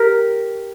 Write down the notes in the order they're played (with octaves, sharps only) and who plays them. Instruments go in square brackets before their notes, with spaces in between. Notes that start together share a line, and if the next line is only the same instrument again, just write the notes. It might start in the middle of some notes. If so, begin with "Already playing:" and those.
Already playing: [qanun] G4 A#4